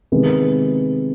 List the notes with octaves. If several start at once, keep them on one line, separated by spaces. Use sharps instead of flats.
C3 D#3 G#3 B3